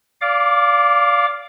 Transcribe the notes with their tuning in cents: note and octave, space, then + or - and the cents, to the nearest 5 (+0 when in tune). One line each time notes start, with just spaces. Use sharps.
D5 -25 F5 +0 D6 +0